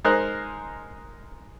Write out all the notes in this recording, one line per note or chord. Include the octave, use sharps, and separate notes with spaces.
G#3 D#4 A#4 C5 D#5 F#6